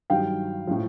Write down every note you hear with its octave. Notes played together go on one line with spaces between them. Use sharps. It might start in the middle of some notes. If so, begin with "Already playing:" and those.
G2 D#3 F#3 F5 G5
A2 F3